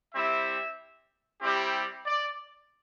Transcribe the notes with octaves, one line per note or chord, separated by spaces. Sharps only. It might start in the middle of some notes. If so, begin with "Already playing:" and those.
G3 C4 E4 E5
G3 C4 E4 G4
D5